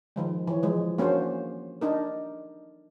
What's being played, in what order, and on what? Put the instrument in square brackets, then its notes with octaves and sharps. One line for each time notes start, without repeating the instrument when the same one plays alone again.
[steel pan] D#3 F3 G#3
E3 C#5
F3 G#3
A#3 C#4 D4 F#4 C5
D4 D#4 A#4